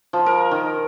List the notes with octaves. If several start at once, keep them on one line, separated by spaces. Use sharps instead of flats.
F3
A#4
D#3